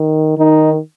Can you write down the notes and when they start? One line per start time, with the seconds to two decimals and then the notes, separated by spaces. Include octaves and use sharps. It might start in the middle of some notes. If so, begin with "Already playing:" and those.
Already playing: D#3
0.38 D#3 D#4